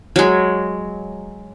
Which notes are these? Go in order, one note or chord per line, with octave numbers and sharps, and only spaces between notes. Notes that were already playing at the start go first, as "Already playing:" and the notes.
F#3 G#3